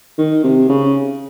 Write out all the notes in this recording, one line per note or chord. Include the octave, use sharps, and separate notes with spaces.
D#3
C3
C#3